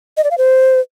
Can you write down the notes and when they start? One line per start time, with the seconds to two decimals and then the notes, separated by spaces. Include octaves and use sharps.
0.17 D#5
0.24 D5
0.31 F5
0.38 C5